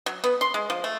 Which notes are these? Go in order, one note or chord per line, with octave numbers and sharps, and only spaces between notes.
F#3
B3
C6
G#3
F3
A3